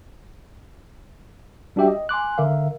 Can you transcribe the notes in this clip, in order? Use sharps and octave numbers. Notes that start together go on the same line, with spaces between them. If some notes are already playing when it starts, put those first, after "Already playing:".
G3 D4 F#4 G4 E5 G5
D#5
G#5 C6 D6 F#6
D3 A#4 E5 F5